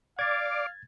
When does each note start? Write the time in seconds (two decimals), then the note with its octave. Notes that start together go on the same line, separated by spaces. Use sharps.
0.19 D5 F5 D6 G#6 A6